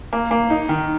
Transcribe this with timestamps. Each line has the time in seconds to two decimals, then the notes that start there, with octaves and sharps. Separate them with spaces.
0.13 A#3
0.31 A#3
0.50 D#4
0.69 D#3